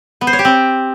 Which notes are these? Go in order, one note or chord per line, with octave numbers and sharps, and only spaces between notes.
B3
C5
C#5
G4
C4